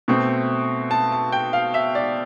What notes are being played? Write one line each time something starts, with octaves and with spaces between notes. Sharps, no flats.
B2 A3 C4
A5
A5
G5
F5
E5
D5